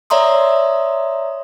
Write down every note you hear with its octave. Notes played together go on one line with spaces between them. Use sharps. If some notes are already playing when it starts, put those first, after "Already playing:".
C#5 D5 E5 A#5 C6 D#6